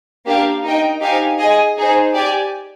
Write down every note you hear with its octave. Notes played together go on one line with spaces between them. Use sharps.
A#3 D4 G4 A#4 F5
D#4 A#4 D#5 G5
D#4 G4 C5 F5 G#5
G#4 D#5 G#5
D#4 G#4 C5
G4 D5 G#5